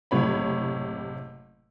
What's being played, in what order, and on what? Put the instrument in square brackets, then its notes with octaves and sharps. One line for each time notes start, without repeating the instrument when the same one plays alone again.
[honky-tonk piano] F#1 A2 C3 C#5 B5